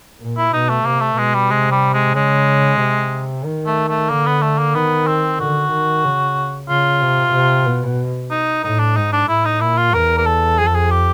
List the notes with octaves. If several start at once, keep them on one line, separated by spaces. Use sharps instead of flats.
A#2
E4
B2 D#4
A3
C3 A#3
A3
B2 G#3
G3
C3 G#3
G3
G#3
C#3 G#3
C3
D#3
A3
A3
D3 A#3
B3
A3
A#3
D#3 B3
C4
D3 F#4
D#3
C#3
C#3 F4
C3
C3
B2
D#4
A2 D#4
D4
G#2 D#4
D4
A2 E4
D#4
A#2 E4
F4
E2 A#4
A#4
A4
F2 G#4
A4
G#4
G4